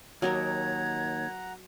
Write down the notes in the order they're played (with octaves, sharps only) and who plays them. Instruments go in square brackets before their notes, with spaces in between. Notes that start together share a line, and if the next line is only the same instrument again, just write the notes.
[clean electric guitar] D#2 [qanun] F#3 A#4 C#5 [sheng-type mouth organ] F#5 A#5 [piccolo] G#6